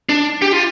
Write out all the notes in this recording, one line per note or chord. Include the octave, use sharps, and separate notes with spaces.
D4
G4
F4